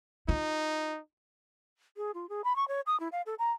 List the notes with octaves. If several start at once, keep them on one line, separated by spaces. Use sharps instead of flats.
D#4 F4
G#4
F4
G#4
B5
C#6
C#5
D#6
E4
F5
A4
A#5